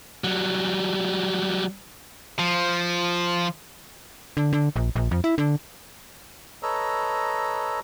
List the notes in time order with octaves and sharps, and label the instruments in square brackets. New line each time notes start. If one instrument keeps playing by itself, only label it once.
[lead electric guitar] F#3 G3
[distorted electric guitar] F3
[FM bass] D3
D3
A#1
A#1
F2
E4
D3
[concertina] A4 B4 C#5 D#5 A#5 E6